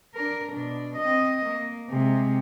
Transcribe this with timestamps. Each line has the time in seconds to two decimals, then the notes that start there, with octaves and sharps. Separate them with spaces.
0.14 D4 A#4
0.52 B2 D4
0.97 C4 D#5
1.45 A#3
1.90 C3 G#3